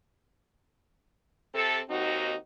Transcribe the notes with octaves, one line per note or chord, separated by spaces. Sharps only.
C3 A4
D#2 C4 D#4 F#4